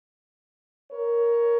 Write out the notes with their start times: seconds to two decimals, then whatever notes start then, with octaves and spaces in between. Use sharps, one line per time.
0.90 A#4 C#5